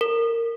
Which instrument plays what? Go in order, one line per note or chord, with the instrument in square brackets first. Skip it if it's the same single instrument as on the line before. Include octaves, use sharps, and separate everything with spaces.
[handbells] A#4